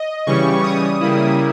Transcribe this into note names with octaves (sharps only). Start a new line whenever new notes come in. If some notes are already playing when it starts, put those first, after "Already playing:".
Already playing: D#5
C#3 E3 G3 C#4 C#6
D#6
C#3 G3 A#3 E4